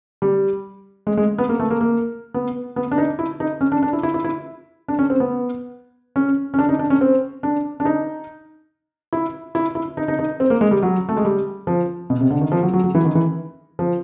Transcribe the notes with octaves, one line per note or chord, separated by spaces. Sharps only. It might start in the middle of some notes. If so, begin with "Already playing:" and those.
G3
G#3
G#3
B3
A#3
A3
A#3
A#3
B3
B3
D4
D#4
E4
D#4
C#4
D4
D4
E4
E4
E4
E4
D4
C#4
C4
B3
C#4
C#4
D4
D#4
D4
C#4
C4
D4
D4
D#4
E4
E4
E4
D#4
D#4
D#4
C4
A#3
G#3
G3
F#3
A3
G#3
G3
F3
B2
C3
D3
D#3
F3
F#3
F#3
F#3
E3
D#3
E3
F3